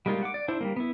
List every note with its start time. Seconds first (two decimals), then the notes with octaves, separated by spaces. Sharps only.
0.06 G3 G#3 A#3 D#4 F4
0.23 F#5 D6
0.34 D5
0.48 D4 E4 C5
0.61 G3 G#3 A#3
0.76 B3 E4